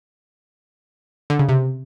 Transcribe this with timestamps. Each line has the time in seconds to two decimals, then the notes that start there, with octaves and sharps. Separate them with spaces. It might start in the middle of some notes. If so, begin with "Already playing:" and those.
1.30 D3
1.39 C#3
1.49 C3